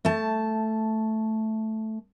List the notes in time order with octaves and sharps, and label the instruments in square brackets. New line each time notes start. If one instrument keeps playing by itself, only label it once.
[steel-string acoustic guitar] A3 A5